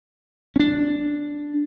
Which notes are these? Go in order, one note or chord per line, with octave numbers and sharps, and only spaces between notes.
C#4 D4